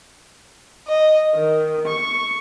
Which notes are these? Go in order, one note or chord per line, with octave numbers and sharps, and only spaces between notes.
D#5
D#3
C#6